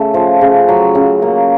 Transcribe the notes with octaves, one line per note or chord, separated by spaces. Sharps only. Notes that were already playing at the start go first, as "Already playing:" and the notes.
Already playing: C#3 A3
F3
C#3
F#3
C#3
A#3